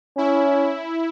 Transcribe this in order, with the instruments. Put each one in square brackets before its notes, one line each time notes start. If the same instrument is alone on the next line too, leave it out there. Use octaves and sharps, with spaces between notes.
[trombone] C#4 [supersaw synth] E4